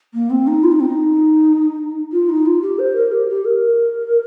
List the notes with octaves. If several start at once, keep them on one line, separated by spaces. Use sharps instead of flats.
A#3
C4
D#4
F4
D#4
C4
D#4
F4
D#4
F4
G4
C5
A#4
G4
G4
A#4